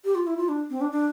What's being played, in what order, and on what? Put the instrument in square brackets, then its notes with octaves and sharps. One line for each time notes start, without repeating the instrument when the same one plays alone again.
[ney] G4
F4
E4
F4
D4
C4
D4
D4